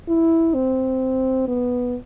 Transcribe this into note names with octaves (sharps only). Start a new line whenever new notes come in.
E4
C4
B3